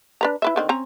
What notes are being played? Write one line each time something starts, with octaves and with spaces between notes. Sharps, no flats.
D4 B4 A#5
E4 B4 E5
D3 D#3 C4
C4 C#4 A#5